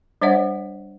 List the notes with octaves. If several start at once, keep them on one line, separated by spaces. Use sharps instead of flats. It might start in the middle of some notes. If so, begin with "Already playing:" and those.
G3 D4 C5 C#5 E5 F#5